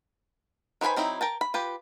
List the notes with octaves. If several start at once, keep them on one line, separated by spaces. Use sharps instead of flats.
D#3 B4 C5 G#5 B5
F#3 C4 D#4 E4
A#4 G5 A5
B5
F4 G4 B4